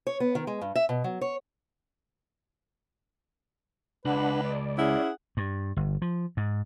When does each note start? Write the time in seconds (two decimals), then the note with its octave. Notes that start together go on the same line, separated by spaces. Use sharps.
0.07 C#5
0.20 B3
0.35 D#3
0.47 G#3
0.61 G2
0.75 E5
0.89 B2
1.04 F#3
1.21 C#5
4.05 C#2 D4 B4 F#5
4.44 D5
4.78 C#4 E4 G#4 F#5
5.37 G2
5.77 G1
6.02 F3
6.37 G#2